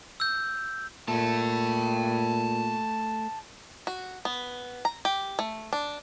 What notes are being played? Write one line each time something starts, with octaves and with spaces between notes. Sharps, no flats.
E6 G6
A#2 A3 G5 A5
F#4
B3
A#5
G4
A3
D4